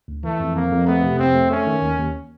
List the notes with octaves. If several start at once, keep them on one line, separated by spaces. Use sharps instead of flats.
D2
E3 A3
F2
F2 A#3
F2
A3 B3
C3
F2 C4
A3
A3 C#4
D#3
D#2
D#2